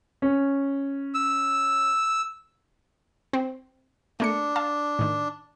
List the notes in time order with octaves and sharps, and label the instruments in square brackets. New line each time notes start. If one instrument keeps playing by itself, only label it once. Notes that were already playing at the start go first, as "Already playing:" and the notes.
[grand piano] C#4
[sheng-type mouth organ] E6
[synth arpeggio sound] C4
[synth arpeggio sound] A3 A#3 C#7 [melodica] D4
[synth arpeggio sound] F5 A5 A6
A2 D#3